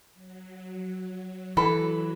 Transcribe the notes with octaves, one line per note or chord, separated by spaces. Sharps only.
F#3
E3 A4 B5